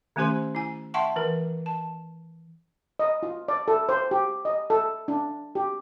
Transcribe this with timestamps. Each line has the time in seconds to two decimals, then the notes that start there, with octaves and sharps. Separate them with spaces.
0.16 D#3 A3 C#4 G4 C5 C6
0.55 E4 G#5
0.94 E5 F#5 G5 A5 C6 C#6
1.16 E3 A#4
1.66 A5
2.99 D#5
3.23 F4
3.48 D5
3.68 A4
3.89 C5
4.11 G4
4.45 D#5
4.70 A4
5.08 D4
5.55 G4